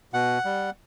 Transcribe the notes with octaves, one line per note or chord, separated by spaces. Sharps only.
B2 F#5
G3